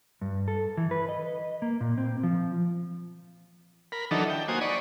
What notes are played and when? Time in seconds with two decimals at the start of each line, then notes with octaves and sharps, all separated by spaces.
0.21 G2
0.48 A4
0.77 E3
0.91 B4
1.09 D#5
1.62 A#3
1.81 A#2
1.98 C4
2.23 F3
3.92 A#4 B5
4.11 D#3 E3 F#3 D4 D#4 A4
4.30 G5
4.48 A#3 F#4 C5 G#5 D#6
4.61 D5 D#5 B5 C#6